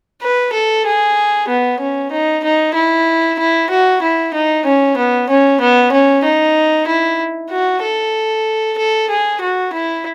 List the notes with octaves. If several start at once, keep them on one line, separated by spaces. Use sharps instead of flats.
B4
A4
G#4
B3
C#4
D#4
D#4
E4
E4
F#4
E4
D#4
C#4
B3
C#4
B3
C#4
D#4
E4
F#4
A4
A4
G#4
F#4
E4